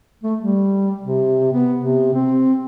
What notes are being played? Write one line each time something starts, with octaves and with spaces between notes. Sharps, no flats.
A3
G3
C3
B3
C3
C4